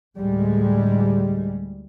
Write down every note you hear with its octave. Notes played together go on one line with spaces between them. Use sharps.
D2 A2 G3 G#3